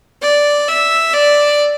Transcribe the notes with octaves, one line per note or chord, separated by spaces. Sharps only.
D5
E5
D5